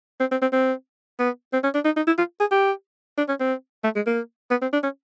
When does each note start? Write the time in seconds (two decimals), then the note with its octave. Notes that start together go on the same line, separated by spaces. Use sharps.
0.20 C4
0.32 C4
0.42 C4
0.53 C4
1.19 B3
1.53 C4
1.64 C#4
1.74 D4
1.85 D#4
1.97 D#4
2.07 E4
2.18 F4
2.40 G#4
2.52 G4
3.18 D4
3.29 C#4
3.40 C4
3.84 A3
3.96 G#3
4.07 A#3
4.51 B3
4.62 C4
4.73 D4
4.83 C#4